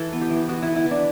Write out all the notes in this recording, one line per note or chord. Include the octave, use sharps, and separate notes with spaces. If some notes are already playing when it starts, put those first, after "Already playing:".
Already playing: E3 A4
B3
G4
E3
B3 F#4
B3 E4
E4
E3
D4